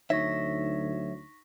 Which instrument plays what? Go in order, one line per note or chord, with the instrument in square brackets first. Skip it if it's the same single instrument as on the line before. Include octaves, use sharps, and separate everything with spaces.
[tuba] D2 [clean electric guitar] F#3 C#5 E5 [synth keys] D#4 [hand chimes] C#6 A#6 B6